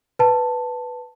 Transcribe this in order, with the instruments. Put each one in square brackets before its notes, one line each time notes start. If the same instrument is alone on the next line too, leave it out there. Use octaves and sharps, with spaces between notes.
[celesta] B4 A5